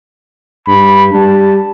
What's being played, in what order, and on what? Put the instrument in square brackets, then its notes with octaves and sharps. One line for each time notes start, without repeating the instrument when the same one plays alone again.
[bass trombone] G2 [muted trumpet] B5
[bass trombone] G3 [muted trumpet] A5